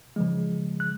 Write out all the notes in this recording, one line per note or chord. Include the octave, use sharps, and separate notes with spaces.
C#3 F3 G#3
F#6